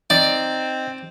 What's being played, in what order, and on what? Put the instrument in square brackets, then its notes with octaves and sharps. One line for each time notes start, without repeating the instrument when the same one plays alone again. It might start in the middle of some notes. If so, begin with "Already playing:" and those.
[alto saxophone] C4 [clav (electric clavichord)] D#4 [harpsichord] D5